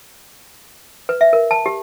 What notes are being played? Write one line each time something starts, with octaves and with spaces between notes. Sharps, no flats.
B4
E5
A#4
A5
G4